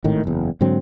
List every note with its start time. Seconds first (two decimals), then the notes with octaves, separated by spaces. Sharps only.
0.04 G#1 A2 D#3
0.24 F#1 E2
0.61 G#2 D3 F#3 C4